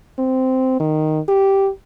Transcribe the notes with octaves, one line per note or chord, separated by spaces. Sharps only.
C4
D#3
G4